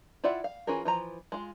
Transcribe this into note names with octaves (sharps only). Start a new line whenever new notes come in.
E4 F4 D5 E5 F#5
F5
E3 C#4 F4 G#4 A#4
E3 F3 A#5
G#3 F4